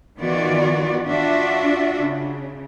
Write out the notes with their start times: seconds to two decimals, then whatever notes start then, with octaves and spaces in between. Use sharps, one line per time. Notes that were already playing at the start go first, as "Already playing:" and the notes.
0.17 D#3 E3 B3 F4 F#4 D5
1.07 D4 F4 F#4 D5 E5
1.98 C#3